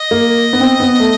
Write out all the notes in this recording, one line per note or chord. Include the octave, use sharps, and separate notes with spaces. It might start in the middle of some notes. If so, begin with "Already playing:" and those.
Already playing: D#5
A#3
B3
C4
B3
A3